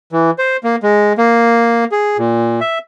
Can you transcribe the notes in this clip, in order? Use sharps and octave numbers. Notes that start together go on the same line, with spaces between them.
E3
C5
A#3
G#3
A#3
G#4
A#2
E5